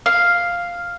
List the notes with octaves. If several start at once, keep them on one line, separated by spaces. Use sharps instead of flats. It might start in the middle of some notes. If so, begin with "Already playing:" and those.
F5